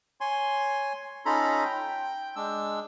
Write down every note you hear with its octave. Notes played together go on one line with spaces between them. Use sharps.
C#5 G#5 C6
C#4 D#4 F4 A4 A#5 B5
G5
G#3 D4 E6